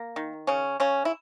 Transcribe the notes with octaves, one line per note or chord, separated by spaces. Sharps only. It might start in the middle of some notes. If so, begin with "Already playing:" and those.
Already playing: A#3
D#3
C#3 C#4
C#3 C#4
E4